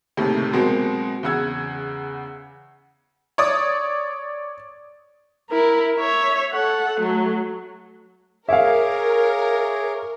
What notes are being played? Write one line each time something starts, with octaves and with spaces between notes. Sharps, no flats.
F#1 D#2 A2 C3
B2 F#3 G#3 A#3 C4
E2 C#3 F#5 E6 G#6
C#5 D5 D#6
E4 A#4
C#5 E5
A4 F#5
F#3 A3
G#4 A#4 C#5 E5 F5 D6